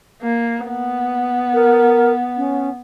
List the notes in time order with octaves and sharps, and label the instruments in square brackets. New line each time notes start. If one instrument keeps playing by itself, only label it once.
[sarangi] A#3
B3
[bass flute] A#4
C#4